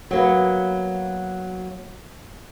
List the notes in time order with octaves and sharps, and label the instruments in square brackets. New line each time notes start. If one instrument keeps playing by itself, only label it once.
[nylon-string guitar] F#3 A#3 B3